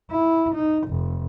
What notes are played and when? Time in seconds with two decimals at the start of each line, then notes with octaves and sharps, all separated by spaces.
0.11 E4
0.55 D#4
0.88 F1